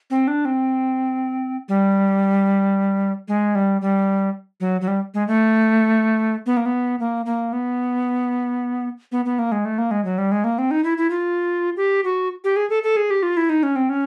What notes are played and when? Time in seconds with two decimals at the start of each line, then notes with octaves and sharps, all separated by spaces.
0.10 C4
0.28 D4
0.45 C4
1.69 G3
3.28 G#3
3.55 G3
3.81 G3
4.60 F#3
4.81 F#3
4.88 G3
5.14 G#3
5.28 A3
6.46 B3
6.57 A#3
6.66 B3
7.00 A#3
7.26 A#3
7.53 B3
9.12 B3
9.25 B3
9.39 A#3
9.52 G#3
9.65 A3
9.78 A#3
9.91 G#3
10.05 F#3
10.18 G3
10.32 G#3
10.44 A#3
10.58 C4
10.71 D#4
10.84 E4
10.98 E4
11.10 F4
11.77 G4
12.04 F#4
12.44 G4
12.56 G#4
12.70 A4
12.83 A4
12.97 G#4
13.10 G4
13.23 F4
13.37 E4
13.50 D#4
13.63 C#4
13.76 C4
13.89 C#4